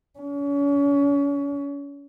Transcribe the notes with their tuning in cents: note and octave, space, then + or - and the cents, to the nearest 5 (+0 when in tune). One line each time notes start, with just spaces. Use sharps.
C#4 +35